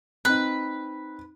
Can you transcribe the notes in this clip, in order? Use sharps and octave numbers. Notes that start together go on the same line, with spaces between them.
C4 D#4 B4